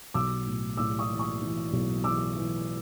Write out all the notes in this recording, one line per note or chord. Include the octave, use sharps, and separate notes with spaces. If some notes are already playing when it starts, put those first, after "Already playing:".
B1 D6 E6
A2
A2 D6 E6
C#6 D#6
E3
C#6 D#6
E3
B1
E3 D6 E6
E3